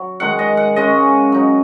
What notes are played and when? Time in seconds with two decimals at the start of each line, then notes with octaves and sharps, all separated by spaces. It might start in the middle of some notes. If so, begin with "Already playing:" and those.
Already playing: F#3
0.20 D#3 G#3 D#4 F#5
0.39 D#5
0.57 F#5
0.76 C#3 G#3 C#4 D#5
1.32 F#3 D#4